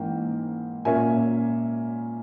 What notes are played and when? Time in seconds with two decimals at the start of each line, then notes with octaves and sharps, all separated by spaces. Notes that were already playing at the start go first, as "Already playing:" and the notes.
Already playing: G#2 E3 A#3 C#4 G5
0.85 A#2 A#3 C#4 E5 G#5